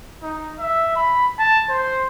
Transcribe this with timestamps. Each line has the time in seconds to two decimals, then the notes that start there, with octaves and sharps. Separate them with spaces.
0.22 D#4
0.59 E5
0.96 B5
1.39 A5
1.69 C5